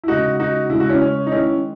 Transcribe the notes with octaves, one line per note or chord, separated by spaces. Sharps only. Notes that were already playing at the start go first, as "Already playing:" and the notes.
E4
C#3 G#3 D#4 F#4
D#4 F#4
C#3 G#3 E4
F#4
C#4 E4
C#4
D#4
D#3 G#3 C#4 E4